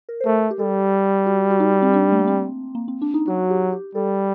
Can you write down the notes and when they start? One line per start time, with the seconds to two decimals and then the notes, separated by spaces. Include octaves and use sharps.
0.09 A#4
0.20 C5
0.25 A3 A#4
0.51 G4
0.59 G3 A4
1.26 F#4
1.50 F#4
1.60 D#4
1.82 C4
1.94 D4
2.12 A3
2.19 A#3
2.27 C4
2.75 A#3
2.88 C4
3.02 D4
3.14 D#4
3.28 F#3 F#4
3.50 G4
3.73 G4
3.95 G3 A4